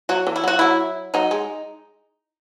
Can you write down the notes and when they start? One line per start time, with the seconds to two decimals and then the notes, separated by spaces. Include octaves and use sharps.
0.09 F#3 F#4
0.27 E3
0.36 E4
0.44 F#3 F#4
0.59 F#3 E4
1.14 F#3 D#4
1.31 G#3